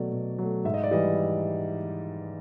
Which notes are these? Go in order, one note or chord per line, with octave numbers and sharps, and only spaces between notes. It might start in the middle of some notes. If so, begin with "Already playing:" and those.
Already playing: B2 F#3 A3 D5
B2
F#3 A3
G#2 E5
D#5
D5
E3 G3 D#5